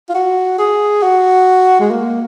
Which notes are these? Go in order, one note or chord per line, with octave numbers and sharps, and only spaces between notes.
F4
F#4
G#4
F#4
G#3
A#3